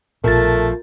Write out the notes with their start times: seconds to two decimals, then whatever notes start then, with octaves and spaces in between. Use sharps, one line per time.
0.24 A#1 B2 F3 A3 A#4 A6